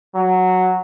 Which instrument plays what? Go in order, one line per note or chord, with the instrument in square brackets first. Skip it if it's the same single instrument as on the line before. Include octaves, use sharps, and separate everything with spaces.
[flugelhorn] F#3